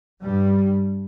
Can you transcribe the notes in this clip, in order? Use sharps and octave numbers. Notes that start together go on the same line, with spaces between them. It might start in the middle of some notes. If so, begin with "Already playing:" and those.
G2 G3